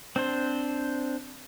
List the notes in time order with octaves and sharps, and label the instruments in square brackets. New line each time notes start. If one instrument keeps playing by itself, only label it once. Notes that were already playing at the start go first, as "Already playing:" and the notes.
[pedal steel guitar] C4 D4 C5